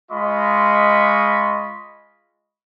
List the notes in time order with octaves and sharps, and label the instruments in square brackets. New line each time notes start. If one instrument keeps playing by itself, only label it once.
[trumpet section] G#3 F4 D#5 B5 C#6